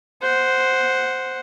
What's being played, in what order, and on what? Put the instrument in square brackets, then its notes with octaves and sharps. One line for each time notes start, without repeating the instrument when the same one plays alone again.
[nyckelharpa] C5 F#5